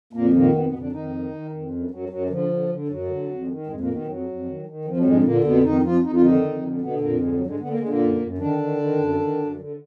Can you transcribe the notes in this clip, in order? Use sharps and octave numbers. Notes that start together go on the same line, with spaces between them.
F2 A#2 A#3
A#2 D#3 A#3
F2 B2 B3
B2 B3
F2
D3 D4
F2 D#3 D#4
D#3
D#3
F2
F#2
F#2 F#3
F#2 F#3
D3 F3
D3
D3
F#2 F#3
D3
F2
D#3
F2 G#2 G#3
A#2 A#3
D#3
B2 B3
F2 F#3
F2
D#3
D#3
F2 F3
F#3
G#2 D3 G#3
A#2 D3 A#3
F2 B2 B3
F2 D#3 D#4
F2 F3 F4
F2 D#4
F4
D3 D#3 D#4
F2
D3
B2 D3 B3
F2 A#2 A#3
G#2 D3 G#3
F#3
D3
G#2 G#3
D3 B3
A#3
D3 G#3
A#2 A#3
F#2
F#2
D3 D#3 D4
D#3
D#3
F#2
D#3
F#2
D3